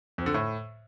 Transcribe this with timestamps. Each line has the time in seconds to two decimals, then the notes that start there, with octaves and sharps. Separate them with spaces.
0.18 F2
0.26 D3
0.34 A2